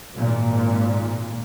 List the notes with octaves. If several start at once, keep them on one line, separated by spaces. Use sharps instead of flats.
G#1 A#2